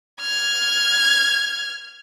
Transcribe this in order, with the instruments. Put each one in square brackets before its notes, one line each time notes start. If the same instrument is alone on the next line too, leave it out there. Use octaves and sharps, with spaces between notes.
[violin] F6 G#6